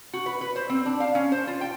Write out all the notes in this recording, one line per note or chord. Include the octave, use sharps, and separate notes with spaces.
F#4
B4
B4
C5
C4
D4
F5
C#4
C5
F4
G5